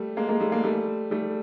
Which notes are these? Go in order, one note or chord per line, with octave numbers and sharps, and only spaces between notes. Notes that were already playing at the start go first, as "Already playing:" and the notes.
Already playing: G3 A3
G#3 A#3
G#3 A#3
G3 A3
G#3 A#3
G3 A3
G3 A3